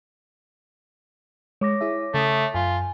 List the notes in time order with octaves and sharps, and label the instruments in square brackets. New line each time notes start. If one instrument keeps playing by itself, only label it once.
[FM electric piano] G#3 [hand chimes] C#5 D6 A#6
[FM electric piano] E4 G#4 E5
[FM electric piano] C#3 E5 D#6 [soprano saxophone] A3
[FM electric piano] F#2 [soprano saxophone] F4 [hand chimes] G#5